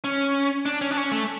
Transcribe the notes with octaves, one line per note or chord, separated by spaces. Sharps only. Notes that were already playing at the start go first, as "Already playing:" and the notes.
C#4
D4
C#4
D4
C#4
A3